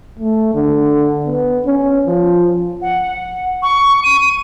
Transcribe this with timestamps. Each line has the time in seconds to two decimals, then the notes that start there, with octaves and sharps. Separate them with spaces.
0.19 A3
0.55 D3
1.26 B3
1.66 C#4
2.07 F3
2.82 F#5
3.62 C#6
4.04 D#7